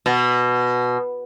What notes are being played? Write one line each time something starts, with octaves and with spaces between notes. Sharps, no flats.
B2